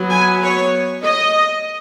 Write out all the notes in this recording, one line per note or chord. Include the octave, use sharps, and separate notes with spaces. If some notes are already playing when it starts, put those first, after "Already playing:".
Already playing: F#3 B3
G#5
C#5
D#5